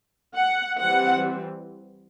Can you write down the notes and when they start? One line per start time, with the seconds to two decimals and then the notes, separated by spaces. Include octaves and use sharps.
0.35 F#5
0.79 E3 G3 C4 F#5